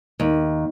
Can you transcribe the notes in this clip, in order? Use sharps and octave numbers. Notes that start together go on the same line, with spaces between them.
D#2